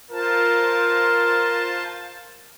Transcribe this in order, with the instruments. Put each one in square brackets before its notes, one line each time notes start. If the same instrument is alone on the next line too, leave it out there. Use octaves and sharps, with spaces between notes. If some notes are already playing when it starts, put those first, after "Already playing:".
[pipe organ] F4 C5 A5 [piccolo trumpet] A#4